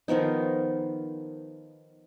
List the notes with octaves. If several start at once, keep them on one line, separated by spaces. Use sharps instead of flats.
D#3 F3 B3 D#4